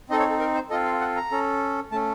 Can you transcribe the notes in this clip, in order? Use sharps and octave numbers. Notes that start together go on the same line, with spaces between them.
C4 D#4 A4 D#5
C#5
A4
A#4
C5
C4 F4 A4 D#5
F5
F#5
A#5
C#4 A4
A3 C#4 A4 A5